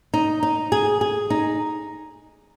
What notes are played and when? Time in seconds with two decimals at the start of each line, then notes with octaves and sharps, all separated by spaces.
0.14 D#4
0.43 D#4
0.72 G#4
1.01 G#4
1.30 D#4